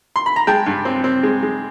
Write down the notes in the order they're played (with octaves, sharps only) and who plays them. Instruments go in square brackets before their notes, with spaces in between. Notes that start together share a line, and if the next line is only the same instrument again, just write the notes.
[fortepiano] C6
B5
A#5
G#3 G5 A5
G2
C4
C4
G#3
G#3